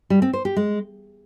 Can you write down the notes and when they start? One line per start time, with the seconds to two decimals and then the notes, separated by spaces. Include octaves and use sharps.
0.10 G3
0.22 C4
0.33 C5
0.45 G4
0.56 G#3